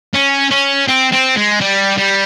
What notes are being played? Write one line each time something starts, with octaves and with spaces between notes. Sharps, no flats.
C#4
C#4
C4
C4
G#3
G3
G3